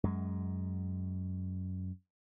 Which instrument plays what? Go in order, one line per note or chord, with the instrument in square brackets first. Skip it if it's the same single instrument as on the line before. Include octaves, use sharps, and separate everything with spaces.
[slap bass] F#2 G#3